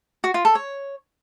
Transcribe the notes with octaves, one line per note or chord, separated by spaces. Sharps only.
F#4
F4
A4
C#5